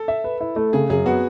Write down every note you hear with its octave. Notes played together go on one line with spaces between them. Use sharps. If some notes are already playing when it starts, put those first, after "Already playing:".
Already playing: A4
E5
B4
E4
A3
C#3 G#4
F#2 G#4
B3 F#4